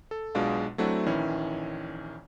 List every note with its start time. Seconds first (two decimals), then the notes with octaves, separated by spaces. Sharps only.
0.11 A4
0.35 B1 B2 G#3 D4 F4 F5
0.78 F#3 A3 C4 D4 E4 F#4
1.06 A#1 D#3 E3 C#4 E4 C#5